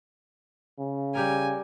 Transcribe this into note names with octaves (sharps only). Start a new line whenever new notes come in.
C#3
G3 G4 A#4 G#5